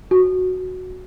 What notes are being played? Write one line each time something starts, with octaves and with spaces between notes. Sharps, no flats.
F#4